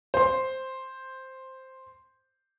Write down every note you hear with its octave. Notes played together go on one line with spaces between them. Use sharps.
C5 C6